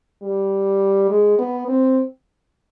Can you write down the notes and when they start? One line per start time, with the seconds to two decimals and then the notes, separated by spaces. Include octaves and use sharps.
0.22 G3
1.10 G#3
1.39 B3
1.68 C4